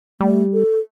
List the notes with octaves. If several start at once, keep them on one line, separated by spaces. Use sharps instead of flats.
G3 A3
A4